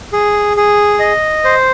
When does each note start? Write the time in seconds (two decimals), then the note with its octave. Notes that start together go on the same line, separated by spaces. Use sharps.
0.13 G#4
0.57 G#4
1.00 D#5
1.44 C5